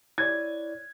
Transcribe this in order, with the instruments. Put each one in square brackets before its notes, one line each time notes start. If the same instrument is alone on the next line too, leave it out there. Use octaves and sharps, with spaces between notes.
[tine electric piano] E4 C#5 D5 [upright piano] G#6